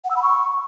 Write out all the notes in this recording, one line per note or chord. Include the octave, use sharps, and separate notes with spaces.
F#5
E6
B5
C#6